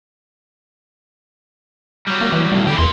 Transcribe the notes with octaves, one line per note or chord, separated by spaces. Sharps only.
F#3 G3
A#3
E3
B1 A2 G3
D3 E3 G4
E2 A#2 C6